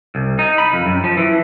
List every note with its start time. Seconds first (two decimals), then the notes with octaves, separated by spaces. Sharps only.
0.15 C2
0.39 D#4
0.58 B5
0.73 F2
0.86 F#2
1.04 F3
1.17 E3